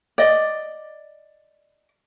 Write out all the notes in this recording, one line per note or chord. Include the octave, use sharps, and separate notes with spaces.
D5 D#5